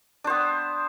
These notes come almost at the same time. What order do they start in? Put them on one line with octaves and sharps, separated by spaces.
D4 C5 B3